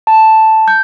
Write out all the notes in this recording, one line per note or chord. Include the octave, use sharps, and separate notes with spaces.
A5
G6